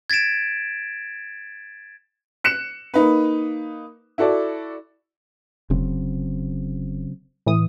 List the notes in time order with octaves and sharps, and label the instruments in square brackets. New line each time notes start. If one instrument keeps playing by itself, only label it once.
[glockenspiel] G#6 A6 B6 D7 E7
[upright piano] F#6 C#7 E7
A#3 D#4 B4
E4 F#4 A4 D5
[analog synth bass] F1 [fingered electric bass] C#3 F#3 C4
[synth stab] A2 E3 D#6